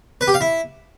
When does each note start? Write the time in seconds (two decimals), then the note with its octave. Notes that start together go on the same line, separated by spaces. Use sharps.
0.21 B4
0.28 G4
0.34 F5
0.41 E4